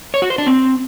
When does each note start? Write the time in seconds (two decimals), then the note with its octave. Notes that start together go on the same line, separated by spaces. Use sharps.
0.14 C#5
0.22 F#4
0.30 C5
0.38 D4
0.46 C4